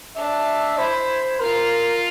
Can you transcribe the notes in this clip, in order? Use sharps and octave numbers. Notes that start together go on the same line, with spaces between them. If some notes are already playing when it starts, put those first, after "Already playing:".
D4 E5
E4 C5
F4 A#4